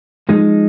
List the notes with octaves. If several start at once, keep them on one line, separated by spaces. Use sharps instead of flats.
F3 G#3 D#4